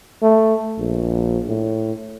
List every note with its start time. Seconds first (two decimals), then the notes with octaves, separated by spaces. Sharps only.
0.22 A3
0.79 A#1
1.47 A2